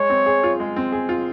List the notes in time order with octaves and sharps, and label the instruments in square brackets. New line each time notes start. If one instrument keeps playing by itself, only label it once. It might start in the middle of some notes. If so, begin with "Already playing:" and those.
Already playing: [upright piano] G#3 [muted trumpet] C#5
[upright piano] C4
G#4
F4
G#3
C4
G#4
F4